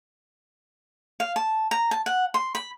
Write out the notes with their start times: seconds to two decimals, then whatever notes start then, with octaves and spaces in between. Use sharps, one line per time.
1.20 F5
1.36 A5
1.71 A#5
1.91 A5
2.06 F#5
2.34 C6
2.55 B5